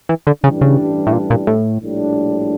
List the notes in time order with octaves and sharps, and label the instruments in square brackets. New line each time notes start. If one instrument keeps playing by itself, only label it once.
[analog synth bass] E3
D3
[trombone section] A1 G2 E3 G3 D4 [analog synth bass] C#3
[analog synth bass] C#3
A2
A#2
A#2
A2
[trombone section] A#1 A2 G3 D4